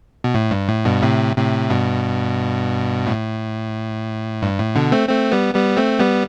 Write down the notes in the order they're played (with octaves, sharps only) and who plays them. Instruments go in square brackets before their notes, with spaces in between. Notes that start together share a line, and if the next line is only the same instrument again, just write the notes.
[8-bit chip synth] B2
A2
G2
A2
G2 B2
A2 C3
A2 C3
G2 B2
A2
G2
A2
B2 D3
A3 C4
A3 C4
G3 B3
G3 B3
A3 C4
G3 B3